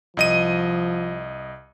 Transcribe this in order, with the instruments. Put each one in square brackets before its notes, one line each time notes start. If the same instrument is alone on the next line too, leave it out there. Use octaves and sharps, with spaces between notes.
[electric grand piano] C2 D#5 D#7 [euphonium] F3